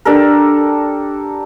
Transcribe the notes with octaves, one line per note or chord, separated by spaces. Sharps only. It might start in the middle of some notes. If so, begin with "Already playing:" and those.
D4 G4 A4 A#4